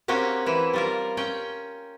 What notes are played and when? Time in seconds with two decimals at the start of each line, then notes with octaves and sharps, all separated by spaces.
0.08 A#3 C4 C#4 F#4 G4
0.46 E3 E4
0.73 G3 F4 A#4
1.17 C#4 G5